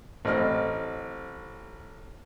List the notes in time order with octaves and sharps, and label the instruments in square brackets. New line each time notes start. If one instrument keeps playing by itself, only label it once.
[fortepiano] A1 C4 D#5 F6